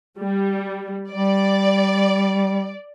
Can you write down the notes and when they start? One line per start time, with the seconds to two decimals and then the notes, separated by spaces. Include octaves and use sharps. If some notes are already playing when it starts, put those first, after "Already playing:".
0.19 G3
1.11 G3 D5